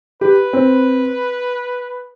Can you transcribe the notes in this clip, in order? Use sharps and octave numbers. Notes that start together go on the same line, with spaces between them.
G4 B4
C4